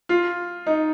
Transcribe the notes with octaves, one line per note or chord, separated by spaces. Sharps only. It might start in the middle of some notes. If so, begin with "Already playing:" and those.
F4
D#4